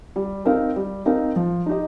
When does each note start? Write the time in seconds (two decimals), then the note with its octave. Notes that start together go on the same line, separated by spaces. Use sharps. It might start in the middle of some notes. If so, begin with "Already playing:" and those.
0.16 G3
0.45 C4 D#4 A#4 F5
0.76 G3
1.06 C4 D#4 A#4 F5
1.36 F3
1.66 D#4 G4 D#5